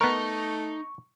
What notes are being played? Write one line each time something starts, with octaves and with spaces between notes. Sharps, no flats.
A3 B3 D#4 A#4 C#6